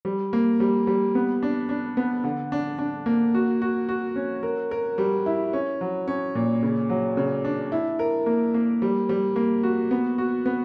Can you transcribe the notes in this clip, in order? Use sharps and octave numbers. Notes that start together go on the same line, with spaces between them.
G3
A#3
G3
G3
B3
D4
D4
B3
D3
D4
D4
A#3
F#4
F#4
F#4
C#4
A#4
A#4
G3
E4
C#4
F#3
C#4
A#2
C#3
F#3
C#3
D4
E4
A#4
A#3
A#3
G3
G3
A#3
F#4
B3
F#4
B3